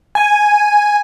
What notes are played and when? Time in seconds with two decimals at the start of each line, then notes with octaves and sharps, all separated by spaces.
0.15 G#5